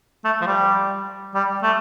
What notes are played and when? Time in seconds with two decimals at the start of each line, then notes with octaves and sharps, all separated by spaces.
0.25 A3
0.41 F3
0.46 G3
1.34 G3
1.63 A3